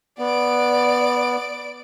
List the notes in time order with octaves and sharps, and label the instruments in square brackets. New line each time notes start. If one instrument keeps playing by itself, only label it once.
[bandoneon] B3 [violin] D5 D7